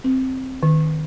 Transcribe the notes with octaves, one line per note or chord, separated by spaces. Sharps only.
C4
D#3